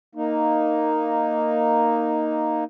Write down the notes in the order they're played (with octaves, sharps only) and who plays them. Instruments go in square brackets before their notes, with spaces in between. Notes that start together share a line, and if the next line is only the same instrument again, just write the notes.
[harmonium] A#3 D#4